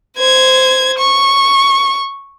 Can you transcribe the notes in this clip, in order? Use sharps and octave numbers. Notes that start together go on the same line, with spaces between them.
C5 G#6
C#6